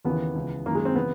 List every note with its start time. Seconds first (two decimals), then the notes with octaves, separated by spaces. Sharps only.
0.05 D#2 C#3 E3 B3
0.35 C#2 C#3 E3
0.66 F#2 D#3 A#3
0.75 G#3
0.85 C4
0.95 C#3 E3 B3